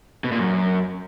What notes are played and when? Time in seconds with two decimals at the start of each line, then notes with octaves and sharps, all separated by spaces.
0.24 B2
0.32 A#2
0.39 F#2